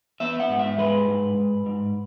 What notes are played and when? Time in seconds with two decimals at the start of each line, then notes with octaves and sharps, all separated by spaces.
0.20 B3 E5
0.40 F#5
0.49 G#2
0.59 E5
0.78 G#3 B4
1.08 G#2
1.38 G#2
1.66 G#2